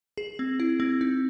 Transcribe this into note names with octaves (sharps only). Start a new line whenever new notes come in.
G#4
C4
E4
C4
D#4